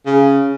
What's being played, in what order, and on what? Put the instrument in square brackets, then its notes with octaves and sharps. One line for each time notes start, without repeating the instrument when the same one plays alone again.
[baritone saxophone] C#3